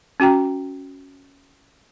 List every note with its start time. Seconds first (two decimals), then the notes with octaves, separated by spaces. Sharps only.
0.20 C#4 F#4 G5 A#5